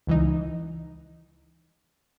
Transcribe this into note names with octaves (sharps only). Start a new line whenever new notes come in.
C#2 E3 D#4